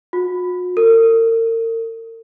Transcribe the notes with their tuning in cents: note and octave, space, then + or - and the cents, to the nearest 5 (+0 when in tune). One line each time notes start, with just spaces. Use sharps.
F#4 -45
A#4 -40